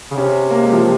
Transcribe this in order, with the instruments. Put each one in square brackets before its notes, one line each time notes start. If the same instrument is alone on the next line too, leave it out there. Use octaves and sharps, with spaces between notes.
[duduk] C#3
[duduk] C3 [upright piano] C#4
[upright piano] A#3
G#3
F3